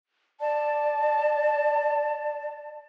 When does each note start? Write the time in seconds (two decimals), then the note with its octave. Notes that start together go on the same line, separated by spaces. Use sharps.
0.41 D5 A5